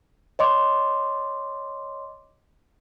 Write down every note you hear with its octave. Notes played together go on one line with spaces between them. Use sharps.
C#5 D#5 C6 D6